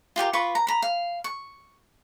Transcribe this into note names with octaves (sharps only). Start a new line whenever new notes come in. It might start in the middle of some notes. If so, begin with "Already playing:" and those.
F4 G4 G#4 A#4
F4 B4 B5 C#6
A#5
A#5 B5
F5
C#6